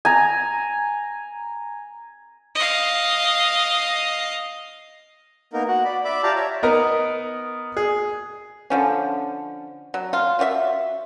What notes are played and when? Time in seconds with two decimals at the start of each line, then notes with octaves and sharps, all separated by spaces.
0.05 G#5 A#5
2.55 D#5 F5
5.53 A#3 B3 D#4 A#4
5.68 F#4 F#5
5.85 D5 B5
6.05 D5 E5 B5 D6
6.23 F4 G4 D5 F5 A5 A#5
6.36 C#5 E5
6.63 B3 D#4 A#4
7.77 G#4
8.70 D3 F3 C#4
9.94 F#3
10.13 F4
10.39 F4 F#4 D5 E5